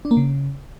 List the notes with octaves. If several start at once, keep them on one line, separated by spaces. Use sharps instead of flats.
D4
A#3
C#3